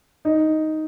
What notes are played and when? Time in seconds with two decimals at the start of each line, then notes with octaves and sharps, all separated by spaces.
0.25 D#4